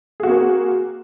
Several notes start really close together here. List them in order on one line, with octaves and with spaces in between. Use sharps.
G#4 F#4 C4 A#3